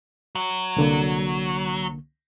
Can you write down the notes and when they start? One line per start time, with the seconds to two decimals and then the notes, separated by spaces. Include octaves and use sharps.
0.35 F#3
0.77 C2 D3 A#3